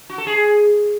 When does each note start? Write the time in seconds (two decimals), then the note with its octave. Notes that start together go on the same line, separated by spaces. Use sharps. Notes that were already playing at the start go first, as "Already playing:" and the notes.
0.09 F#4
0.18 A4
0.27 G#4